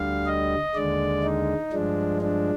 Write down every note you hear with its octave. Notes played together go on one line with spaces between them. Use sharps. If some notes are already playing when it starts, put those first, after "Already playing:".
Already playing: D2 D3 G3 F5
D#5
D#2 D3 G#3 D5
D#4
G2 F3 G#3 D4
D4